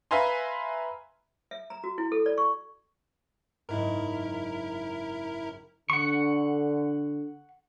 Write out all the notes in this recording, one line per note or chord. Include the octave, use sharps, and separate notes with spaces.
B4 E5 F5 G#5 A#5 C6
E5
A#5
F#4
E4
A4
D5
C#6
F#1 G#2 E4 A#4
D3 F#5 C#6